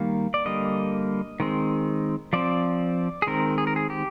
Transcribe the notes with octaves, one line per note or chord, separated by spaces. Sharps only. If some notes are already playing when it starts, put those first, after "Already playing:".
Already playing: D#3 G3 A#3 F5
D5
D3 G3 A#3 D#5
D#3 G#3 C4
F3 C4 D5
G#4
D#3 G#3 C4 A#4
G#4
A#4
G#4
G4